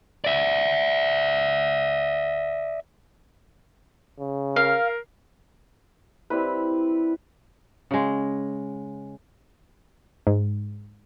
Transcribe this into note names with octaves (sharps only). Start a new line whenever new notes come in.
D5 E5
C#3
A#4 F5
G3 C4 E4 B4
C#3 G#3
G#2